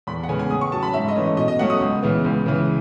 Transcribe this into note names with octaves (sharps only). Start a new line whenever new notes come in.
E2 B5
F#5
C#3 G#3 B3 G#5
G#5
A2 D#6
C#6
F#3 C#4 A5
B5
G#2 E5
D#5
E3 A3 C#4
D#5
B2 D#5
D#5
F#3 A3 C#4 F#5
D#6
C#2
C#3 E3 B3
C#2
C#3 E3